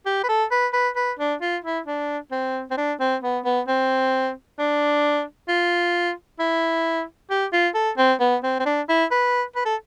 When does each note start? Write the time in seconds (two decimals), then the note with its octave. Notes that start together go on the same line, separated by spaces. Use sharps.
0.06 G4
0.23 B4
0.29 A4
0.51 B4
0.73 B4
0.96 B4
1.19 D4
1.41 F4
1.64 E4
1.87 D4
2.31 C4
2.71 C4
2.77 D4
3.00 C4
3.23 B3
3.45 B3
3.68 C4
4.59 D4
5.48 F4
6.39 E4
7.30 G4
7.53 F4
7.75 A4
7.98 C4
8.20 B3
8.43 C4
8.60 C4
8.66 D4
8.89 E4
9.11 B4
9.56 B4
9.66 A4